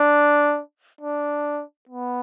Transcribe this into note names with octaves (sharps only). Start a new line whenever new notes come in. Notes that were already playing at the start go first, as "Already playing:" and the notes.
Already playing: D4
D4
B3